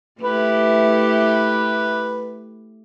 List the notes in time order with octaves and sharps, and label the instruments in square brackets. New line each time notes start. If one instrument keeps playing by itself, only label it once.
[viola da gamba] A3 E4 G4 [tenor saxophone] B4